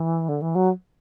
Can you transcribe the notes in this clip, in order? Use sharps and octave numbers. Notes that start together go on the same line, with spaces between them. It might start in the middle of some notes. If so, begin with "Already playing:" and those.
Already playing: E3
D3
E3
F#3